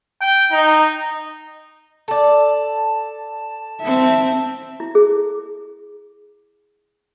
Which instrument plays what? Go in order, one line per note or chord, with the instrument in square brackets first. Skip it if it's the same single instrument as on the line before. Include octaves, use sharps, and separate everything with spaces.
[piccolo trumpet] G5
D#4
[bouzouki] A4 D5 [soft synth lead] A5
[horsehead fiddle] C4 E5
[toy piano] E4
G#4